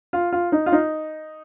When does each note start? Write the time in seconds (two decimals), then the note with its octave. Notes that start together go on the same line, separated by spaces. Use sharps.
0.13 F4
0.32 F4
0.52 D#4
0.66 F4
0.72 D#4